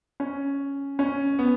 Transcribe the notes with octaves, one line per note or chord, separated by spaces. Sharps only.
C#4
C#4
B3